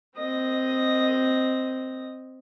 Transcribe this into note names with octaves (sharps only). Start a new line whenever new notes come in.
C4 D#5